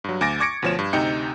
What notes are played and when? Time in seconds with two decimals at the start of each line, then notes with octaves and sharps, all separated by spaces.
0.04 G2 F#3
0.21 D2 G#5 D6 A6 A#6 D7
0.40 C#6 D6 G#6 A#6 C#7 D7
0.62 D2 B2 F3 C#5 E7
0.79 G2
0.93 D2 C3 D#4 G5 G6 C#7